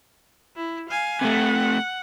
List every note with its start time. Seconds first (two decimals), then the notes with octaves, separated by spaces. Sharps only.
0.56 E4
0.90 F5 G#5
1.22 C3 A3 F#5